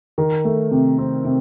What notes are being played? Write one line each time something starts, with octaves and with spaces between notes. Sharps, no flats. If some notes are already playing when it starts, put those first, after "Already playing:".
D#3
A3
C3
C4
C3